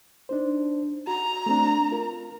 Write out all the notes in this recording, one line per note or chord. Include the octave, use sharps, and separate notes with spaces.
D4 D#4 C5
F#4 A#5
A3 C4 D4
F4 A#4